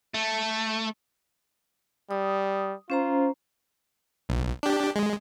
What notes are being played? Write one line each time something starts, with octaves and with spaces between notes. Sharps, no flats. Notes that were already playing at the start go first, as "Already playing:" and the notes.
A3
G3 D#6
C#4 F4 C5 A#5
B1
D4 G4
G#3